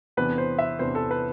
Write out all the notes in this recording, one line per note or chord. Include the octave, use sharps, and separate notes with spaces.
E2 C3 E3 B3 D4 B4
C5
E5
E2 C3 E3 B3 D4 C5
A4
B4